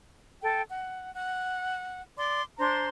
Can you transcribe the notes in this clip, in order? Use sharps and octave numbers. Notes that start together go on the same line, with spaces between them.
A4 G5
F#5
F#5
D5 C6 D6
D4 C5 A#5 C6